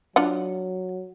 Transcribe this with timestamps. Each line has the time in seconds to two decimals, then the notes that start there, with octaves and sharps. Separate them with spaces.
0.16 F#3 D4 F4 F#5